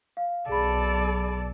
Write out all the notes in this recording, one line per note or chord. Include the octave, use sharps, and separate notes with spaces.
F5
B1 G#4 A4 D5 B5